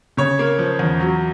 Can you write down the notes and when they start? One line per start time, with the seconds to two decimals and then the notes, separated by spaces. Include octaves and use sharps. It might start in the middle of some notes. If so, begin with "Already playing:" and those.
0.17 C#3 C#5
0.39 A#3
0.59 F3
0.79 E2
1.00 F#3